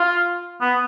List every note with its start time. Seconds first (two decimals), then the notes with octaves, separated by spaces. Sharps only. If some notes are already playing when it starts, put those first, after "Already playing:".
Already playing: F4
0.61 B3